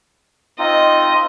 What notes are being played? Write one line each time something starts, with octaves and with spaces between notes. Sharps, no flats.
C4 D#4 F4 D#5